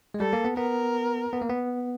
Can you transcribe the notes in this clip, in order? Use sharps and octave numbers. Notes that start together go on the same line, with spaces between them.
G#3
G3 A4
A#3
B3
B3 A#4
B3
A#3
B3